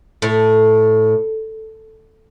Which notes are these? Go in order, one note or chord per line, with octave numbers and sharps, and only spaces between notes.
A2